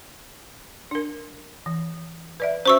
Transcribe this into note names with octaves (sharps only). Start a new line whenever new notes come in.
D4 A#4
E3
B4 D5 E5
C#4 F#4 C5 E5 C#6 E6